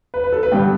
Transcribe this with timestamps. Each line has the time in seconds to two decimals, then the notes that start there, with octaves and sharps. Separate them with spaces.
0.14 B4
0.24 B4
0.32 A4
0.43 B4
0.52 G2 D3 G3 B3 G5